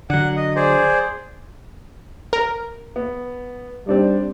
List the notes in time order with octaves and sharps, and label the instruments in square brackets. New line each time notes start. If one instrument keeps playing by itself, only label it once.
[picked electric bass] D3 F#3 [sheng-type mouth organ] F#5
[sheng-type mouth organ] D#5
G#4 C5 D5
[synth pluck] A#4
[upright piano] B3
[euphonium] G3 [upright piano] C4 D4 D#4